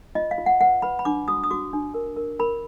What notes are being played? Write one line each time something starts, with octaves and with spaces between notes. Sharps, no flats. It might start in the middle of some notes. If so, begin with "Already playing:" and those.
F4 D#5
F5
F4
F#5
B4 F#5
B4 B5
B5
D4 D6
F#4 D#6
D#6
F#4 D6
D4
A#4
A#4
A#4 B5